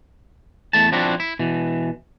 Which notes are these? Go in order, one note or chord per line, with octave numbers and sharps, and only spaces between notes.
E2 A3 A5
F3 C4 D4 E4 F#4
E4
B2 E3